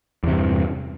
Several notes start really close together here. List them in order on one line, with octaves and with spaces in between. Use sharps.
E2 C3 G2